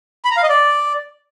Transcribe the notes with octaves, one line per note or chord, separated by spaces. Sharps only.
B5
A#5
F5
D#5
D5